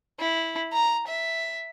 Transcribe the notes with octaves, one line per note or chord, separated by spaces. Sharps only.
E4
A#5
E5